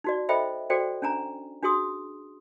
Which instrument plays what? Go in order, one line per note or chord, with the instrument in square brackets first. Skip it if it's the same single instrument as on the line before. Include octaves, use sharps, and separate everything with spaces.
[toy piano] D#4 F#4 D5
A4 C5 D#5 E5 G5 B5
F#4 A4 C5 D5 G5
C#4 D4 G#5 A#5
D4 F#4 G#4 C6 D#6